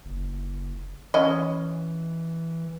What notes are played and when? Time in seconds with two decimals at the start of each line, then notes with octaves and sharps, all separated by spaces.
0.05 F#1
1.14 E3 C#4 D#5